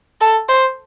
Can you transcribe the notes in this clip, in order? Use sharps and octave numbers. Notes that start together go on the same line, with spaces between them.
A4
C5